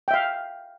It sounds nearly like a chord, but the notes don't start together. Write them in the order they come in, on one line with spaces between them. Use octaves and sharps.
G5 E5 F5